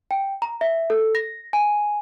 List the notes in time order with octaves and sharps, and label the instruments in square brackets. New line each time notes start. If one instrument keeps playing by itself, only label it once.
[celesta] G5
A#5
E5
A4
A#6
G#5